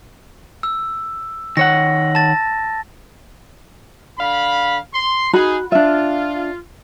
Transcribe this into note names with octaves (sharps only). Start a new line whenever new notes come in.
E6
D#3 C#5 F#5 A#6
A5 A6
D3 F5 B5
C6
D#4 F#4 G#4 B5
D4 F4 E5